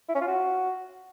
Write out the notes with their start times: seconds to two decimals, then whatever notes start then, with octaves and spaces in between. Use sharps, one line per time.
0.09 E4
0.15 C#4
0.21 F4
0.28 F#4